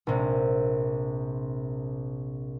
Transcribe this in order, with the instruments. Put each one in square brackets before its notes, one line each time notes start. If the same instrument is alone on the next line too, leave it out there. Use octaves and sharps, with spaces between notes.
[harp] A#1 C3